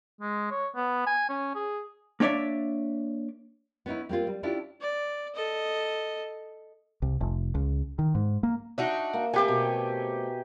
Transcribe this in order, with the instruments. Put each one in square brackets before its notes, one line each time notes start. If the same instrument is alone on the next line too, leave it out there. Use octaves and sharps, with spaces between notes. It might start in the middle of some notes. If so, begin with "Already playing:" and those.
[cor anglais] G#3
C#5
B3
G#5
C#4
G#4
[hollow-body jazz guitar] A#3 D4 C#5 D5 E5
[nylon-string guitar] B3 C#4 D#4 E4
G3 A#3 C4 F4
G3
C#4 D4 E4 F4 G4
[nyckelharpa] D5
A4 D#5
[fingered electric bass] C2
F1
C#2
D#3
G#2
A#3
[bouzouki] D4 D#4 F#4 [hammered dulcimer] E5
[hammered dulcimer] A#3
[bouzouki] A3 C4 [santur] G4 G#5
[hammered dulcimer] B2